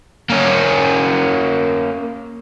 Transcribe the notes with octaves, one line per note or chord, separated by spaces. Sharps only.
A#3 C#4